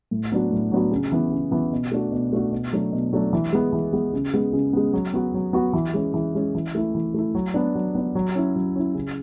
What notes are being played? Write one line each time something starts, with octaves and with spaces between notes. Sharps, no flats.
A2
F#3 B3 D4 F#4
A2
F#3 B3 D4 F#4
C#3
E3 B3
C#3
E3 B3
B2
A3 D4 F#4
B2
A3 D4 F#4
B2
F#3 A3 D4
B2
F#3 A3 D4
E3
G#3 B3
E3
G#3 B3
C#3
G#3 B3
C#3
G#3 B3
F#3
B3 F#4
F#3
B3 F#4
E3
G#3 C#4
E3
G#3 C#4
E3
A3 E4
E3
A3 E4
F#3
B3 D4
F#3
B3 D4
F#3
C#4 E4
F#3
C#4 E4
C#3